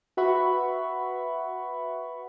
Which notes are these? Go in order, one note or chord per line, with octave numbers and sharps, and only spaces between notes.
F#4 B4 E5 F#5 B5 C#6